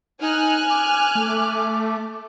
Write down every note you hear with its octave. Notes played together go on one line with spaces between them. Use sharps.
D#4 G#5 F6 F#6
D6
A3